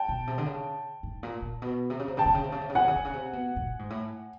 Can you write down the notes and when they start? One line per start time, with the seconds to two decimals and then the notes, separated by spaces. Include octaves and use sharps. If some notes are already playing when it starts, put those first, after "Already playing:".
Already playing: G5 A5
0.09 B2
0.27 C3
0.38 D3
0.46 C#3
1.03 G#2
1.23 A#2
1.42 A#2
1.62 B2
1.90 C3
1.99 C#3
2.08 C3
2.17 C#3 G5 A5
2.26 C3
2.34 C#3
2.44 C3
2.52 C#3
2.61 C3
2.69 C#3
2.75 C3 F#5 G#5
2.88 C#3
2.96 C3
3.05 C#3
3.13 C3
3.33 B2
3.56 A2
3.61 A#2
3.79 G#2
3.90 A2